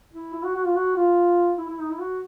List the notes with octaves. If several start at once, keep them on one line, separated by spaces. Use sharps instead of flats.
E4
E4
F#4
F#4
F4
F#4
F4
E4
E4
D#4
E4
F#4